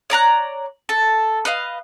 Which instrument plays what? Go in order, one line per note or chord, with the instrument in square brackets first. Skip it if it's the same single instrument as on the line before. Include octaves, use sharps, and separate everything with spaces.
[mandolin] C#5 D5 A#5 F#6
A4
B4 D#5 F5